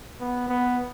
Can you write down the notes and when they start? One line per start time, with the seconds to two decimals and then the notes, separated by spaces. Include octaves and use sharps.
0.21 B3
0.49 B3